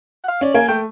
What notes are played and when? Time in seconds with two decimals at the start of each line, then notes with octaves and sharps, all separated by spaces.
0.24 F#5
0.28 F5
0.41 C#4 D5
0.54 A#3 G#5
0.68 A3 G5